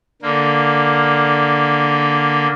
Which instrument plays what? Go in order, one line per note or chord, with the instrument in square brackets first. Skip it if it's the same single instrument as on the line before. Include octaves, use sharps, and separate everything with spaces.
[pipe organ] D3 A#3